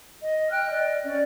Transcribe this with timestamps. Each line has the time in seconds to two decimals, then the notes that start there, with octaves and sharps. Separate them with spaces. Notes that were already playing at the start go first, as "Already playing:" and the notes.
0.22 D#5
0.50 G5 F6 F#6
0.70 D5 D#5
1.03 C#4 D5